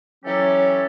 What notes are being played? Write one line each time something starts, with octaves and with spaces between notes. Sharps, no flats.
E3 F#3 C#4 G4 A4 C#5